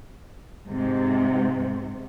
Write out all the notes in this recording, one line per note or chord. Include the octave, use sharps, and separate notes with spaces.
G#2 C3